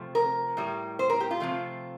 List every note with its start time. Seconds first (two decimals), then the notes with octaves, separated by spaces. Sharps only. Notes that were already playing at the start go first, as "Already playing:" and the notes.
Already playing: C3 F3 A3
0.15 A#4
0.57 A2 G3
0.99 C5
1.10 A#4
1.20 G4
1.31 F4
1.40 C3 F3 A3